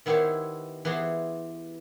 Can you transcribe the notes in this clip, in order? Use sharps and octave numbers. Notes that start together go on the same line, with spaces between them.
D#3 B3 E4 G4 C5 C#5
E3 B3 G4 G#4 C5